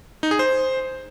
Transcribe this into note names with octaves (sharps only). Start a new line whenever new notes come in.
D#4
G#4
C5